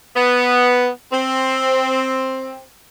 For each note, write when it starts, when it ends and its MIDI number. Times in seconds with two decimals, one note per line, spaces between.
0.16 0.88 59
1.12 2.64 60